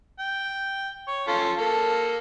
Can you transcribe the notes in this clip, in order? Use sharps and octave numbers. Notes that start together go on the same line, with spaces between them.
G5
C#5
C#4 F4 A4
A#3 A4